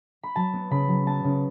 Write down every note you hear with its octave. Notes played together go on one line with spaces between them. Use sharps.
B5
F#3 A5
B3
C#3 B5
F#3
B3 A5
C#3